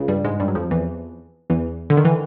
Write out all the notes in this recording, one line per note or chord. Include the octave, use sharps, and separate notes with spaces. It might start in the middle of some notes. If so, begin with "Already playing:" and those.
Already playing: C#2 C#3
G2 G3
G#2 G#3
G2 G3
F#3
F2 F3
E2 E3
E2 E3
D3
D#3
E3